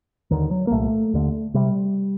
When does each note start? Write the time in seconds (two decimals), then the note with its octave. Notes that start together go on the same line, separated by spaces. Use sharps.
0.31 D#2 D3 D#3
0.51 F#3
0.67 A#3
0.71 C2 A#2 A3
1.13 D#2 D3
1.54 C3 G3